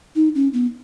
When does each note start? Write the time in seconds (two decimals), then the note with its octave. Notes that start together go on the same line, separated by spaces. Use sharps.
0.16 D#4
0.35 C#4
0.53 B3